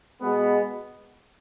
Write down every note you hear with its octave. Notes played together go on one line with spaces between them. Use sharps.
B2 G#3 B3